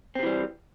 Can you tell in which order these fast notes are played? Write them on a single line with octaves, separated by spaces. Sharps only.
C4 C3 E3 G3